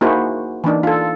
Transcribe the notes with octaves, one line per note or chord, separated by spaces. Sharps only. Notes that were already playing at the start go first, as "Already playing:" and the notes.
A#3 D#4 E4 F#4 G#4 C5
E3 A#3 D4 D#4
F4 A4